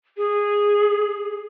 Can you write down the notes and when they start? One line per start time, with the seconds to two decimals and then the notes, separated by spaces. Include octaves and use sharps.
0.17 G#4